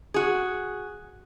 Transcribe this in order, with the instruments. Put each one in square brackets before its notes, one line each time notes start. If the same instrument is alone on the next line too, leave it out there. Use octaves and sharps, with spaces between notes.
[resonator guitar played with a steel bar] F#4 G#4